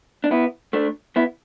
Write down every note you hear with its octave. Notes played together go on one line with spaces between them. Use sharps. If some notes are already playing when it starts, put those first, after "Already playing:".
D4
B3 E4
A3 D4
B3 E4